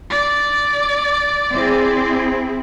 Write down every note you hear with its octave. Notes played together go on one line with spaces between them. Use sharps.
D5
C4 E4 G#4